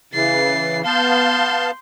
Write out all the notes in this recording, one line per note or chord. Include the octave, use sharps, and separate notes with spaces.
C#3 E3 A6 C7
B3 F5 A5 C6 G6